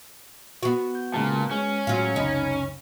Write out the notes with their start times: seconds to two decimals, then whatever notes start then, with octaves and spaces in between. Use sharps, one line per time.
0.63 B3 F#4
0.95 G6
1.14 A#2 C#3 G#3 A5
1.51 G#3 C#4
1.87 A2 F#3 F4
2.16 F#1 C#2 C3 D#4 B5